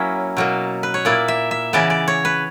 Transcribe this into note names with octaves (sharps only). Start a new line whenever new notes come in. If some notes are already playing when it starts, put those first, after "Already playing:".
Already playing: F#3 A#3 C#4 E4
B2 F#3 A#3
B4
C#5
A#2 A#3 E4 D5
E5
E5
C#3 E3 B3 D5
D5
C#5
B4